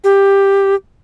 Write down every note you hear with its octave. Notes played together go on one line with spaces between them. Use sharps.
G4